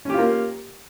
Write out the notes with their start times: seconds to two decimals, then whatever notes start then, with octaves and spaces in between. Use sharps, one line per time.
0.05 C#4
0.10 G4
0.14 F4
0.18 A#3